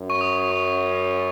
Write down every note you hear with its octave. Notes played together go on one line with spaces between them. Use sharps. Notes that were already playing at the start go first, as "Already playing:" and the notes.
Already playing: F#2
C#6
D#6
C#6